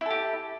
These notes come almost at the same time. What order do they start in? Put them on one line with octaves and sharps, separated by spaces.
E4 A4 G4